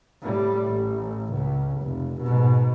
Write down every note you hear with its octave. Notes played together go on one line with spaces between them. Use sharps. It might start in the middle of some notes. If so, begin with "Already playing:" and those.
A2 G3
A1
C#2
F1
G#2 B2